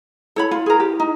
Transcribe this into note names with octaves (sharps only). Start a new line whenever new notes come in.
E4 A4 C#5 B5
F4
G#4 A#4
G4
D#4